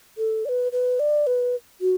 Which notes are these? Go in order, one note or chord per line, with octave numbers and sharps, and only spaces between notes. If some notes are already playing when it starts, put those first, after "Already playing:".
A4
D5
B4
B4
D5
B4
F#4